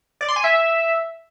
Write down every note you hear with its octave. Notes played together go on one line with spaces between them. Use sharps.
D5
C6
G#5
E5